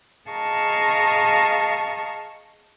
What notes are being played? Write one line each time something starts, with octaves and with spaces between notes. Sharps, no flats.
G#4 D#5 F5 A5 A#5 C#6